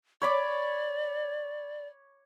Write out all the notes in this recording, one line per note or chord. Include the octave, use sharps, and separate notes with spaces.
C#5 D5 B5 D6